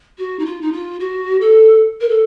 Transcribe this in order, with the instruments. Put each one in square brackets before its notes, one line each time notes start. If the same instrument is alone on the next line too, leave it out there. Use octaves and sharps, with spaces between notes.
[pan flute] F#4
D#4
F4
D#4
F4
F#4
A4
A#4
A4